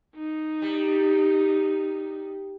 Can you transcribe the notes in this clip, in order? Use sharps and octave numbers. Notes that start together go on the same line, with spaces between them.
D#4
G3